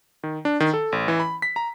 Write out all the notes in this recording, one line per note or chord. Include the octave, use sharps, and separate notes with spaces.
D#3
D4
D#3
A4
A1
E3
B5
B6
A#5